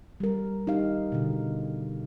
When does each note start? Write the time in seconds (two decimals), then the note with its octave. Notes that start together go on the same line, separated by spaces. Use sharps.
0.20 G3 A#4
0.67 D#4 G4 F5
1.12 B2 D3